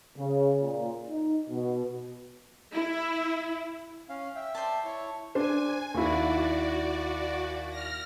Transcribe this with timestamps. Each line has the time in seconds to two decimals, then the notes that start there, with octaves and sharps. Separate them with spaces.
0.17 C#3
0.60 A#2
1.06 D#4
1.49 B2
2.73 E4
4.09 C#4 F5
4.36 E5 G5
4.55 C5 D5 A5
4.85 E4 C#5 C#6
5.35 D4 C5 G#5
5.94 D#2 E4 F#4 D5
7.70 F6 A#6